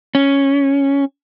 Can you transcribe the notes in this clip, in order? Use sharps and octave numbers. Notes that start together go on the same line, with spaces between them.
C#4